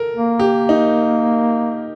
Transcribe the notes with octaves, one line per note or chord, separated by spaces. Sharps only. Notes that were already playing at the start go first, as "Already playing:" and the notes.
Already playing: A4 A#4
A#3
G4
D#4